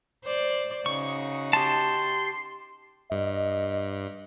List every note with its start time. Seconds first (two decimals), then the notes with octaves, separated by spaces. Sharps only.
0.24 C5 D5
0.86 C#3 D#4 F#4 C#6
1.53 G4 A5 C6
3.11 G2 D#5